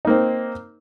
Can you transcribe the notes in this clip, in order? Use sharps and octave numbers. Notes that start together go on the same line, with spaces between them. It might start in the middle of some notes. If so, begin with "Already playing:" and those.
A#3 C4 D#4